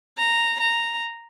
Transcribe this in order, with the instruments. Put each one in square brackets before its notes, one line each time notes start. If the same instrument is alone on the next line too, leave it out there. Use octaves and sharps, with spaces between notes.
[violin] A#5
A#5